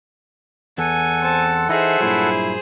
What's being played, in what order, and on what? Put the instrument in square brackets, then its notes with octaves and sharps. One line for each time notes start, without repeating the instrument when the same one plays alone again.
[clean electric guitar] E2 [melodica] A4 F#5 [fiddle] G#5
[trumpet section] C4 C5 A5
[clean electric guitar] E3 D#4 [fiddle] G#4 C5 [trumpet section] E5
[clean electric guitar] G2 A#2 F#3 [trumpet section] E4